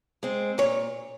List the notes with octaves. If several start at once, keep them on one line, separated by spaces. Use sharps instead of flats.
G#3 C4
A#2 C#5